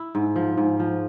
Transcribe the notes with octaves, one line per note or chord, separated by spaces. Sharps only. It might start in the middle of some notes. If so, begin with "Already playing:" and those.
Already playing: E4
G#2
F3
G#2
F3